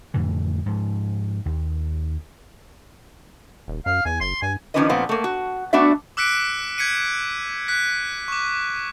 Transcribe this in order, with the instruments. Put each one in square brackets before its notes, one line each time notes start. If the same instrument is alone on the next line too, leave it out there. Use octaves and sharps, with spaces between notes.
[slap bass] F2 A2 D3 E3
G#2 F3
D#2
[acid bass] D#1
[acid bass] F#2 [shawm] F5
[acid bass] E2 [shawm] G#5
[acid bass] F#1 [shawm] C6
[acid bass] G2 [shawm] G#5
[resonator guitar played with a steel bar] D#3 F3 C#4 D4 B4 D#5
A#2 F3 A3 B3 C4
A3 A#3
F#4
A3 B3 D4 F#4 D5 E5
[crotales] D6 E6 F#6 B6 C#7 D7
G6 G#6 B6 C#7 D#7
F#6 B6
C#6 D6